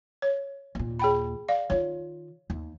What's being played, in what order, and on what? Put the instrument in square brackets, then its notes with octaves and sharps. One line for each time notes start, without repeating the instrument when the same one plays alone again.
[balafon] C#5
[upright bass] D#2 A#2
[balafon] G#4 G5 B5
D5 F5
[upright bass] D#3 F4 [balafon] C#5
[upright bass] D#2